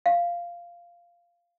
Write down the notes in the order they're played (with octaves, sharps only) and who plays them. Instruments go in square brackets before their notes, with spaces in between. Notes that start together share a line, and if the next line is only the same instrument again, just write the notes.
[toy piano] F5